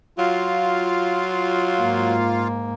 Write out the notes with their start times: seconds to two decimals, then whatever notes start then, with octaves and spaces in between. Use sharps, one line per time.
0.18 F#3 F4 F5
1.81 G#2 A#3